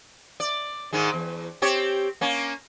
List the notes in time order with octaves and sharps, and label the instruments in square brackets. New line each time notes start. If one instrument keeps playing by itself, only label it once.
[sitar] D5
G#2 D#3 G#3
E2
C4 G4 C#5
A#3 C#4